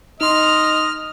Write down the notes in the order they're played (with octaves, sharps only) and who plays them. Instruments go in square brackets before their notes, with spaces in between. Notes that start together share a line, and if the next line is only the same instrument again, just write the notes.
[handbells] D#4 C6 [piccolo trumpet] D#5 [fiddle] F6